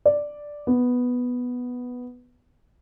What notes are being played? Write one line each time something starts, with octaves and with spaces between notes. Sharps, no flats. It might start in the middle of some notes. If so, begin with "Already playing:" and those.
D5
B3